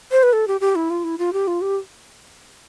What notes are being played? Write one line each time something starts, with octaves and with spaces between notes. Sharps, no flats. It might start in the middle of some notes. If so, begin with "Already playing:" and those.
C5
B4
A4
G4
G4
E4
F4
E4
F4
G4
F4
G4